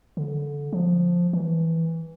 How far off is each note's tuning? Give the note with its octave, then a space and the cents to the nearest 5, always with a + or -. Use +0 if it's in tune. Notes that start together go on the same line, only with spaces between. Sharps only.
D3 -20
F3 +5
E3 -10